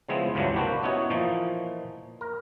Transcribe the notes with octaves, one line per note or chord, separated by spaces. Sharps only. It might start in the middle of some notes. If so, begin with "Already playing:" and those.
C#3 F3 G#3 B3 C4 E4
C#2 G2 C#3 E3 F#3 D4
A#3 C4 D4 F#4 G4 B4
B3 C#4 D#4 E4 F#4 C#5
A#2 E3 F3 D#4
A#4